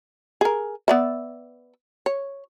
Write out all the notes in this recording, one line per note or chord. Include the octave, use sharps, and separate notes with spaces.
G#4 A#4
B3 D5 E5
C#5